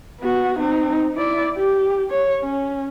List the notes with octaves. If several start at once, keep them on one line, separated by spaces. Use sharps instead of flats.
B3 F#4
C4 D#4
E4 D5
G4
C#5
C#4